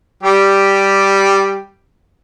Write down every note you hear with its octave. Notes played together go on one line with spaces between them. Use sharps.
G3 G4